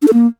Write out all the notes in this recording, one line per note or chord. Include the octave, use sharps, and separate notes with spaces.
D4
A4
A#3